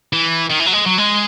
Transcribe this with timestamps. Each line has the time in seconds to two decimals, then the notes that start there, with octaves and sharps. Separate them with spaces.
0.13 E3
0.50 D#3
0.60 E3
0.66 F#3
0.73 G#3
0.87 F#3
0.98 G#3